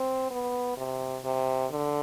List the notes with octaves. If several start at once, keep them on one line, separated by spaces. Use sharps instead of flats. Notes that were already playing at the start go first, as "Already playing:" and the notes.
Already playing: C4
B3
C3
C3
D3